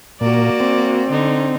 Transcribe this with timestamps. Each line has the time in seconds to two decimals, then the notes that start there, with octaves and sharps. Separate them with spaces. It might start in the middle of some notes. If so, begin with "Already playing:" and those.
0.21 A#2 A#3 F#4 D5
0.60 C4
1.10 D3 D#4